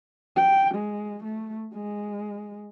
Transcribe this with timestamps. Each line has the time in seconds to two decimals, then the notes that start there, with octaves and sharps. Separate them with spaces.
0.36 G5
0.74 G#3
1.23 A3
1.74 G#3